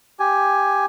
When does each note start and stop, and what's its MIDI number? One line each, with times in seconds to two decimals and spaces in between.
0.19 0.86 67
0.19 0.86 80